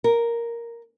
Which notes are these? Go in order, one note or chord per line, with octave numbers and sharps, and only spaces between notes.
A#4